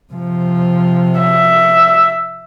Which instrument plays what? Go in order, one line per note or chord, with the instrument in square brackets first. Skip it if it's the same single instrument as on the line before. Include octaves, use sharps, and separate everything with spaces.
[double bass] C3 F3
[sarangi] E5